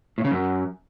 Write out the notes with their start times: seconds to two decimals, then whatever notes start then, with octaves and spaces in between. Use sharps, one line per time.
0.18 A2
0.25 C#3
0.31 F#2